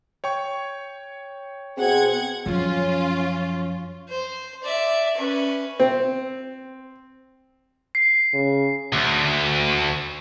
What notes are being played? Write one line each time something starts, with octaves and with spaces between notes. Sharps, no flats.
C#5 G5 C#6
B2 C4 G#4 F#5 G#6
F#2 F3 C#4 F4
C5
D5 E5
C#4 B4
C4
C7
C#3
D2